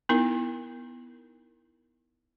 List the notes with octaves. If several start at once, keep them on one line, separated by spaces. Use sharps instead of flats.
B3 D#4 E4 A#4